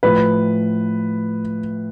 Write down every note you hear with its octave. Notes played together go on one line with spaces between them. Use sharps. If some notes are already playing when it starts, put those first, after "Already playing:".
A2 F3 B4